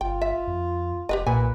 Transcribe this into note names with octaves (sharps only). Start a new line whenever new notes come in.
G1 F4 G5
E5
F2
F1 G4 B4 D#5
B1 A#2 B4 G#5